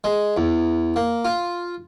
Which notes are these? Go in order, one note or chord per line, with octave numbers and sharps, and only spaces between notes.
G#3
E2
A#3
F4